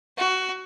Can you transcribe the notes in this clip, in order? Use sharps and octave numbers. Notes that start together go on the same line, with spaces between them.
F#4